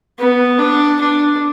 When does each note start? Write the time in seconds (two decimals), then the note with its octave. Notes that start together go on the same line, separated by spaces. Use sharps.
0.19 B3
0.59 D4
1.00 D4